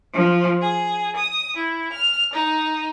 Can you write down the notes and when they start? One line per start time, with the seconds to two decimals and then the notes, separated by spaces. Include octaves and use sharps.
0.13 F3
0.61 G#4
1.16 D#6
1.56 E4
1.93 F6
2.33 D#4